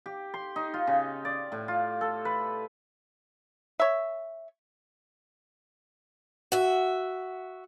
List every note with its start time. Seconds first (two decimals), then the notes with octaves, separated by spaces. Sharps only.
0.06 G4
0.34 C6
0.56 D#4
0.74 F4
0.87 C#3
1.25 D5
1.52 A2
1.68 F4
2.01 A4
2.25 B4
3.80 C#5 E5
6.52 F#4 E5